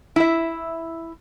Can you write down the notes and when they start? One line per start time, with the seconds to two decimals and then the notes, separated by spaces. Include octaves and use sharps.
0.16 E4 E5